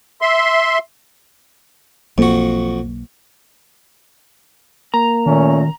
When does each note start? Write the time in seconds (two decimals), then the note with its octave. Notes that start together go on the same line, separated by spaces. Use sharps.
0.21 E5 C6
2.18 B1 F2 A#3 F#4
4.94 A#3 A#5
5.26 A#2 D#3 A3 C#4